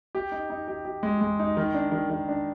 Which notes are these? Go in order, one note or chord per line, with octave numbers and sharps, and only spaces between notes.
G4
D#4
D#4
G4
G4
G#3
G#3
D#4
D#3
D4
D#3
D#3
D4